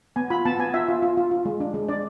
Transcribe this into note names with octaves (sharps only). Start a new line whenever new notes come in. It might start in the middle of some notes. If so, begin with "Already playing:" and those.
B3 G#5
F4 B5
B3 A5
B3 G#5
F4 E5
F4
F4
F4
F4
G#3
D4
G#3
D4 D5